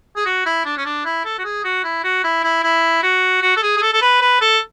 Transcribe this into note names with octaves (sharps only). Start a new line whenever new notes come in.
G#4
F#4
E4
D4
C#4
D4
E4
A4
F#4
G#4
F#4
E4
F#4
E4
E4
E4
F#4
F#4
A4
G#4
G#4
A4
A4
B4
B4
A4